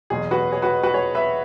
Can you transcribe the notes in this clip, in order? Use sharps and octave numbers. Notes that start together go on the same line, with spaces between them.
F#1 E2 B2 G#4
F#4 B4
G#4 C#5
F#4 B4
F#4 B4
G#4 C#5
B4 E5